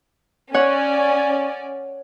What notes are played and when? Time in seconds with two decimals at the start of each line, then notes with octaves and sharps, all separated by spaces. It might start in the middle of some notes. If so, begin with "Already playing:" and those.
0.54 C#4 C#5 D5 F#5